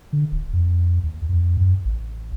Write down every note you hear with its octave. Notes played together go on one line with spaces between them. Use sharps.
D3
D1
F2
D#2
F2
F#2
A1